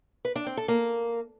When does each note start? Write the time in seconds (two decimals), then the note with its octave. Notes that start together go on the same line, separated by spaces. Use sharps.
0.25 B4
0.36 D4
0.46 C4
0.57 A4
0.68 A#3